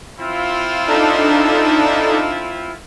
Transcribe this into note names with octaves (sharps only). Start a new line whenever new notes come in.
C4 E4 F4
D4 D#4 A4